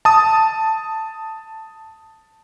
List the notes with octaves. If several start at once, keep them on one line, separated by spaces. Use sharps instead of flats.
A5 D#6